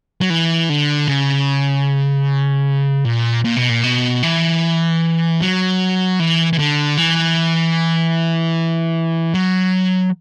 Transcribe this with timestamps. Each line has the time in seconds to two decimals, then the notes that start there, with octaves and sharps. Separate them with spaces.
0.21 F#3
0.30 E3
0.69 D3
1.08 C#3
3.05 A#2
3.44 A#2
3.56 B2
3.69 A#2
3.83 B2
4.23 E3
5.41 F#3
6.19 E3
6.53 E3
6.59 D3
6.98 E3
9.34 F#3